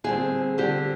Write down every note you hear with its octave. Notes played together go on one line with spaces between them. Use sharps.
D3 G3 C4 G#4
D3 G3 C4 G4